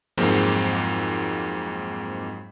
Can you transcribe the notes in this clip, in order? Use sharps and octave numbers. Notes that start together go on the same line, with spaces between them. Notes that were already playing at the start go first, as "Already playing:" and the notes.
F2 G#2 F#3 G#3 A#3 C4